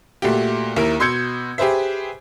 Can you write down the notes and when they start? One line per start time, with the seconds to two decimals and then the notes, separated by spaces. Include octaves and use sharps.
0.22 A#2 A3 F#4 G4
0.76 D#2 E4 A#4
1.00 B2 C6 E6 G6 G#6 C#7
1.58 G4 G#4 B4 C5 E5